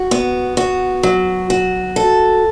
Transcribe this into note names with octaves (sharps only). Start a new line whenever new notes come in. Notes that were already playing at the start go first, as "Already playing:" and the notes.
Already playing: F#4
B3
F#4
F#3
F#4
A4